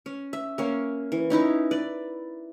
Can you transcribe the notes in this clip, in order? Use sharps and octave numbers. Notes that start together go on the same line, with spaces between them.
C#4
E5
A#3 C#4
E3
C#4 D#4 E4 B4
B4 D5